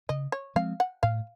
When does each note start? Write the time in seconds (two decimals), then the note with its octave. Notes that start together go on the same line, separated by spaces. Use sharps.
0.09 C#3 D#5
0.32 C#5
0.56 F3 G#3 C4 F5
0.80 F#5
1.03 A2 F5